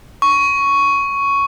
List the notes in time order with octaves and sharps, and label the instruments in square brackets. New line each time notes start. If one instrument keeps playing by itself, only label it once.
[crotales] C#6